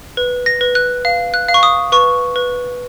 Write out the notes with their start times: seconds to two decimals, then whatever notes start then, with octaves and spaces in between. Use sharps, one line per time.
0.17 B4
0.46 A#6
0.61 B4
0.75 F#6
1.05 F5
1.34 F#6
1.48 F5
1.54 C#6
1.63 D#6
1.92 B4 C#6
2.36 B4